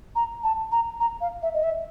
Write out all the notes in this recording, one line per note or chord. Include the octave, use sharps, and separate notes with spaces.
A#5
A5
A#5
A#5
F5
E5
D#5
E5